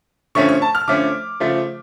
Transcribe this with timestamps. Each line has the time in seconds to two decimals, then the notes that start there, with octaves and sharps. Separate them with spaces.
0.35 D3 F3 A3 C#4 C#6
0.49 C#6
0.62 A5
0.75 F6
0.87 D3 F3 A3 C#4 D6
1.40 C#3 F3 A3 F4